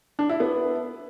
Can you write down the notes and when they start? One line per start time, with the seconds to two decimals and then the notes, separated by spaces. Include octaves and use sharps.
0.19 D4
0.29 E4
0.40 B3